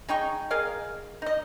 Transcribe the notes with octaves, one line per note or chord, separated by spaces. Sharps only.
G#3 D#4 G5 C#6
G#4 A#4 D#5 F5
D#4 D#5